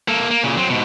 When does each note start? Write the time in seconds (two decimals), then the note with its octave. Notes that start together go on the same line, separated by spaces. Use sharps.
0.08 A#3 A4
0.30 A#3
0.43 A#2 C#3
0.57 F#3 C4
0.69 G#2 B2